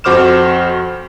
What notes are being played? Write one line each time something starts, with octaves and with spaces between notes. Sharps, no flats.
F2 F#4 C5 D6 F6 E7